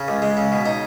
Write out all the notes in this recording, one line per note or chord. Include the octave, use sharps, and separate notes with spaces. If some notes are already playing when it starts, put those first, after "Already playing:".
Already playing: C#3
C#2
G#3
C#3
B2
D#4